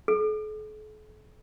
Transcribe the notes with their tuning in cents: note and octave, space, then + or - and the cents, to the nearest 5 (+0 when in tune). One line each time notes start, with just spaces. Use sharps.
A4 -45